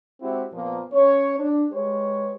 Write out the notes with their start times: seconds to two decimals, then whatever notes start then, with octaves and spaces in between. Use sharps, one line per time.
0.21 G#3 C4 E4 F#4 G4
0.52 F2 A#2 F3 A#3 B3
0.92 C#4 C#5
1.38 D4
1.71 G#3 G4 B4 C#5